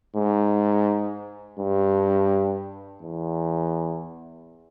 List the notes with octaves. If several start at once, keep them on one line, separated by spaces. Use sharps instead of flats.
G#2
G2
E2